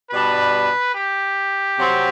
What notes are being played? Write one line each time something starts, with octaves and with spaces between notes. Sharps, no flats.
B2 G3 D4 B4
G4
C3 F#3 C4